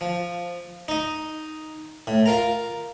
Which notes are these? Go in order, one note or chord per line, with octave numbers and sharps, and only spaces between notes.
F3
D#4 D#5
A2
F4 A#4 A#5